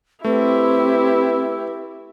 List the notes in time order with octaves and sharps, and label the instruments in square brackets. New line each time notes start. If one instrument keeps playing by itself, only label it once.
[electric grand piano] A3 [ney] C4 [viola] E4 G4 [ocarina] B4